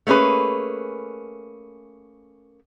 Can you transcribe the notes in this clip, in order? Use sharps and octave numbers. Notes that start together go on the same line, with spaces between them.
A3 A#3 C#4 G#4 B4